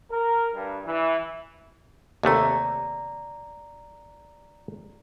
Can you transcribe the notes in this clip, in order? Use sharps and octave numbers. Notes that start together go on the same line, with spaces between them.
A#4
G2
E3
D#2 C3 A3 D5 A#5